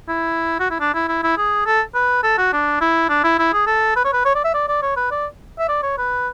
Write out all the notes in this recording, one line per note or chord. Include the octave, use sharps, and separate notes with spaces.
E4
F#4
E4
D4
E4
E4
E4
G#4
A4
B4
A4
F#4
D4
E4
D4
E4
E4
G#4
A4
B4
C#5
B4
C#5
D5
E5
D5
D5
C#5
B4
D5
E5
D5
C#5
B4